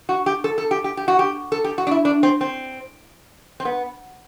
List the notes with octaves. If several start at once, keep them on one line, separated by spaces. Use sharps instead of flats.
F#4
G4
A4
A4
G4
G4
G4
F#4
G4
A4
G4
F#4
D4
E4
D4
C4
C4
C4
B3